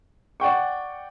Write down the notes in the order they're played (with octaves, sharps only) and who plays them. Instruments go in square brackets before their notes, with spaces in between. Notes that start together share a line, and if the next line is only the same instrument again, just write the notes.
[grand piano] D5 F#5 G5 C#6